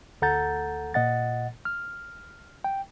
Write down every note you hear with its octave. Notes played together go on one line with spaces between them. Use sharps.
D2 A4 F#5 A#5 G6 A6
A#2 D#5 F#5 A6
F6
G5